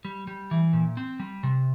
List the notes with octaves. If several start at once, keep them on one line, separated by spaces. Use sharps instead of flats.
G3
G3
E3
A#2
C4
G3
C3